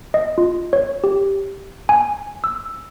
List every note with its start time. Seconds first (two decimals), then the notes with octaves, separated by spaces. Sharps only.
0.14 D#5
0.38 F4
0.73 C#5
1.04 G4
1.89 G#5
2.44 E6